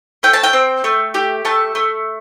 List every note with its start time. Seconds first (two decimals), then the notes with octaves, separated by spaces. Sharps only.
0.23 A3 G5
0.33 A5
0.43 G5
0.53 C4
0.84 A3
1.14 G4
1.45 A3 A5
1.75 A3